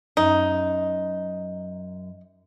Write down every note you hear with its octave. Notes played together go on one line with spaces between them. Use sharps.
F#2 D#4